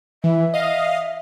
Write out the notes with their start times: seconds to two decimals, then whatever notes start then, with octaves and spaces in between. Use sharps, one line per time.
0.24 E3 E5
0.54 D#5 F5